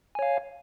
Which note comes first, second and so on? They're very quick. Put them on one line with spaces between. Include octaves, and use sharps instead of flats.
G#5 C#5 F5